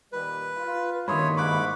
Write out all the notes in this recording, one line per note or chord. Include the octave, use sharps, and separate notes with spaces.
A#2 D#3 G3 B4
F4
G2 D#3 A#3 E4 C#5 B5 C6 D#6
G#2 B5 C#6 D6 F#6